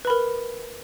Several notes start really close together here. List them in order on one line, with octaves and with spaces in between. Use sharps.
B4 B5 A#4